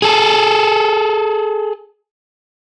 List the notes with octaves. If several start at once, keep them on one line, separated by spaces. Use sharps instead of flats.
G#4 A4